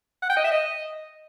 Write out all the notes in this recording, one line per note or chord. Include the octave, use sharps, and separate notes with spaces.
F#5
G5
D#5
E5
D#5